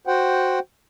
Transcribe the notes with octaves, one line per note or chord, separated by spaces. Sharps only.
F#4 C5 F#5 G5